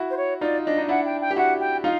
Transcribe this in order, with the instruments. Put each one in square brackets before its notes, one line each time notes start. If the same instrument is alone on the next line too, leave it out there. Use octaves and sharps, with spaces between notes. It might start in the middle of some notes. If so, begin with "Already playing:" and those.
Already playing: [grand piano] E4 F#4
[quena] C5
C#5
[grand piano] D#4 F4 [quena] D5
[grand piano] D4 [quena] D#5
[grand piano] D#4
[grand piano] D4 E4 [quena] F#5
[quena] G5
G5
[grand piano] G4
[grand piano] E4 F#4 [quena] F#5
[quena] G5
[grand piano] D#4 F4 [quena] F5